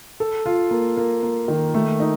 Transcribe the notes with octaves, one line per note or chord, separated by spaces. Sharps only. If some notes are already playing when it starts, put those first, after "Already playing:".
A4
F4
A#3
A#3
A#3
D#3
A3
D#4